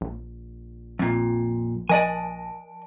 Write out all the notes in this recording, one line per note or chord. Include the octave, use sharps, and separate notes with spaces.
A#1
F2 A#2
F3 D5 D#5 G#5 A5